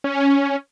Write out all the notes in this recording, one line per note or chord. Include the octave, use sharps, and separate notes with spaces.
C#4